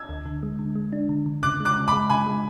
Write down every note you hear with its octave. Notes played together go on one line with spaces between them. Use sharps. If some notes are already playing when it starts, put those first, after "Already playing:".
Already playing: E6 G#6
D2
D3
G#3
D3
G#3
D4
D3
D3
C#3 D6 F#6
G#3
D6 F#6
C#3
G#3 B5 D6
C#3 G#5 B5
G#3